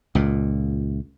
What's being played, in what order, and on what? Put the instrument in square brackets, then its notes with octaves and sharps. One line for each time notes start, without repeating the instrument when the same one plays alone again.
[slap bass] C#2 A#2